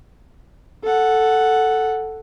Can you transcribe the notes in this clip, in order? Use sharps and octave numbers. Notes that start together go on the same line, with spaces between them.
A4 F#5